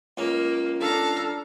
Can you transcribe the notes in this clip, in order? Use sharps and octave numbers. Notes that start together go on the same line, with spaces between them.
C#2 A#3 C#4
D4 A4 F5 A#5